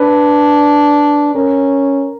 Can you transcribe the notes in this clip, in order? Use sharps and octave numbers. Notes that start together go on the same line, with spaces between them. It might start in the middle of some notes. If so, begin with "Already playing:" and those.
Already playing: D4 B4
C#4 A#4